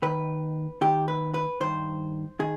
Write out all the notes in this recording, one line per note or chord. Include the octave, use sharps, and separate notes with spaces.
D#2 D#3 B4
D#2 D#3 G4
B4
B4
G2 D#3 C5
D#3 G#4